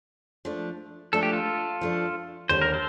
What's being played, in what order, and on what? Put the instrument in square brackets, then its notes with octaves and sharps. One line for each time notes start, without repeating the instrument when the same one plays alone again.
[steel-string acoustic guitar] F3 A3 D4
[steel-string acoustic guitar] F3 A3 D4 [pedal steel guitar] A4
[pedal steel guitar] G4
F4 A4
[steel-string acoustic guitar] F3 A3 D4
[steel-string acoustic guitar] D#2 D3 G3 [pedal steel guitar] C5
[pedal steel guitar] A#4
A4 C5